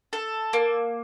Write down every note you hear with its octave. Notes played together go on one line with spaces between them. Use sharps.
A4
A#3